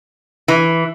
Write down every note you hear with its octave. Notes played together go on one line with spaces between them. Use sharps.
E3